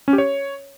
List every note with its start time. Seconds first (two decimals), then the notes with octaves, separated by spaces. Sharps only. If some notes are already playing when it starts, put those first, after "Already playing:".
0.08 C#4
0.13 G4
0.18 C#5